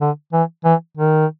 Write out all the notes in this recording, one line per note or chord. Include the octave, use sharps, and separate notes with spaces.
D3
E3
E3
D#3